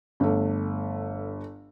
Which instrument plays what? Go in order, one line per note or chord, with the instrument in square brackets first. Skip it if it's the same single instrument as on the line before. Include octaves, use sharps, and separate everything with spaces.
[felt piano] G1 A3